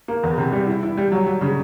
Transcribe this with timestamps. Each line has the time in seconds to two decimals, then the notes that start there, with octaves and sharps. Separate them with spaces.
0.08 A#3
0.23 E2
0.38 C3
0.52 G3
0.67 E4
0.83 E4
0.97 G3
1.12 F#3
1.27 F#3
1.41 C#3